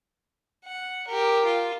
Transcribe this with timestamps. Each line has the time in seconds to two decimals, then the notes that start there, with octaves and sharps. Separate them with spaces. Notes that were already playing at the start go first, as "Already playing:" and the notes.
0.65 F#5
1.08 G4 A#4
1.45 F4